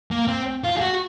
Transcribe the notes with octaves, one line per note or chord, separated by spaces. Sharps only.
A#3
C4
F4
G#4
F#4